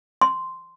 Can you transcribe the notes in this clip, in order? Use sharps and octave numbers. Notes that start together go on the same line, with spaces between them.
C6